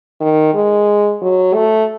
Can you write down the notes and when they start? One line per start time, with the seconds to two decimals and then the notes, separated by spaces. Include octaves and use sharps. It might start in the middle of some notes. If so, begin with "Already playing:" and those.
0.20 D#3
0.54 G#3
1.22 F#3
1.54 A3